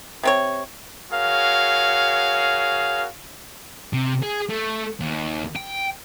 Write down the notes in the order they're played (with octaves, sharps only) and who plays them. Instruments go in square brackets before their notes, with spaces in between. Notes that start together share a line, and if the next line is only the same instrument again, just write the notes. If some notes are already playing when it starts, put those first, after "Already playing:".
[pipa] C3 C4 C#5
[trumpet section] F#4 G#4 A#4 C#5 F5
[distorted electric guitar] C3
G#4
A3
D#2
G5